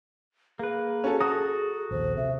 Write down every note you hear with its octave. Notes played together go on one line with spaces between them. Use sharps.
A#3 G#4 B4
C#4 F#4 A4
F#4 A4 A#5 D#6
A#1 D#2 C5
C3 E5